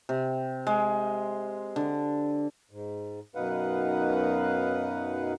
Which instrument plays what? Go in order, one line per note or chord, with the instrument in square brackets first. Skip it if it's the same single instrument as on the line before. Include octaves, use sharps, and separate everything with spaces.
[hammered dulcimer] C3
G#3
D3
[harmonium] G#2
F#2 B2 D#4 B4 F5 F#5